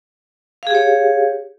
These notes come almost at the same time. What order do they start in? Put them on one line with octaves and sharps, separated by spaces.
F5 G#4 G4 C#5